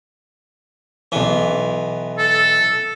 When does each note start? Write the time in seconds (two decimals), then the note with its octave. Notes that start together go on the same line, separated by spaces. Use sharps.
1.12 B1 E3
2.18 A4